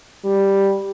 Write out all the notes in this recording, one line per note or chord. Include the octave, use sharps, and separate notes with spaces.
G3